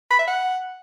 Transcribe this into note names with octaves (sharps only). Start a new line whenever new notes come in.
B5
E5
F#5